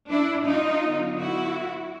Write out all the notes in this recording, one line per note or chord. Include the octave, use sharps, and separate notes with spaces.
D4 E4
D#4 F4
D3 F#3 B3
E4 F#4